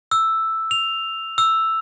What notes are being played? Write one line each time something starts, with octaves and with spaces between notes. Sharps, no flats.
E6
F7
E6